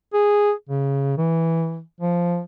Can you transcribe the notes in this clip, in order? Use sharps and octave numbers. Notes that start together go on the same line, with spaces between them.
G#4
C#3
E3
F3